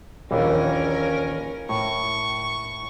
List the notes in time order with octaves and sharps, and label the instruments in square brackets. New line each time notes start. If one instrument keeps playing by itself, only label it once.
[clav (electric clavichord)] A#1 D#2 E3 [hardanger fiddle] C#4 A#4
[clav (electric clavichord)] A2 [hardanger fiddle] C#6